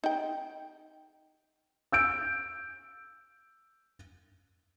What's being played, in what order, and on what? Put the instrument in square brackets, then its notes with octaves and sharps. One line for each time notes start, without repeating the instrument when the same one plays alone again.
[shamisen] D#4 G5
[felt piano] E6 G6 D7